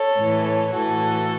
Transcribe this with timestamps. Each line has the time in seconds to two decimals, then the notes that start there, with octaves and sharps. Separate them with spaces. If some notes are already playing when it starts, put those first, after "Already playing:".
Already playing: A4 C#5
0.17 A2 E3
0.45 A4 C#5
0.74 A2 E3 F#4 A4